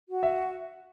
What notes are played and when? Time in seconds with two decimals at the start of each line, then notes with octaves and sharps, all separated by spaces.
0.09 F#4
0.23 E5